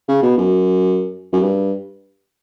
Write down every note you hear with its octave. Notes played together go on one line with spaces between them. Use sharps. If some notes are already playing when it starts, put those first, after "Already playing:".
C#3
B2
F#2
F#2
G2